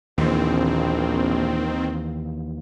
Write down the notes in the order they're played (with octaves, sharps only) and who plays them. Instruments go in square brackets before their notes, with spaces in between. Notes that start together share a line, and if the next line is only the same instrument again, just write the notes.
[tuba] A#1 [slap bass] D#2 E3 [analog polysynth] D#3 C4